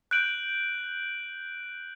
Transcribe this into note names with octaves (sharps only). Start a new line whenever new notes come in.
F#6 G6 D7 F#7